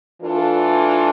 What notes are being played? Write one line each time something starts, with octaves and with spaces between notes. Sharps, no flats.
E3 A3 D4 F4 A4